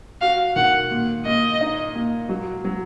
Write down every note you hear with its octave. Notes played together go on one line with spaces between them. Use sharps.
F#4 F5
D#3 F#5
A#2
A#2 D#5
D#4
A#2
F#3
F#3